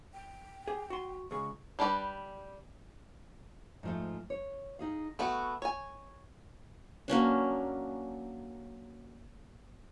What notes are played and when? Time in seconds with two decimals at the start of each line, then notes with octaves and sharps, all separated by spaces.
0.14 G5
0.67 G4 G#4
0.90 F#4 C6
1.31 C#2 G#4 C#6
1.79 G3 D4 G4 B4 D5
3.83 G#2 F3 A3
4.30 C#5
4.79 D#4 G#4 F5
5.19 A3 B3 F#4 G5
5.62 C#5 G#5
7.08 F#3 A#3 C#4 D4